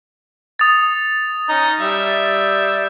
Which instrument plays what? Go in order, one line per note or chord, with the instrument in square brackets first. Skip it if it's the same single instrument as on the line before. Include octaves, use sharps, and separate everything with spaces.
[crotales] D#6 A6
[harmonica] C#4 D#4 A#5
G3 E5